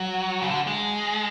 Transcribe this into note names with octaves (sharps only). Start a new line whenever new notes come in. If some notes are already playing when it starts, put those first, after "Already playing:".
Already playing: F#3
C#3
D3
G#3